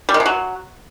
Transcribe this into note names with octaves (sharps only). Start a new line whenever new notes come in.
G3
D#3
C3
F#3